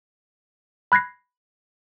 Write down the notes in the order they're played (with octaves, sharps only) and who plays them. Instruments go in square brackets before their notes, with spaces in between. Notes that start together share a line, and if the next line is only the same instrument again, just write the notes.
[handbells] B5 F#6 G#6 A#6 C7